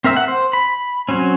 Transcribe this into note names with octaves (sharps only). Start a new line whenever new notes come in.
C4 A#4 E5 E6
F#5
C5
B5
F#3 C4 C#4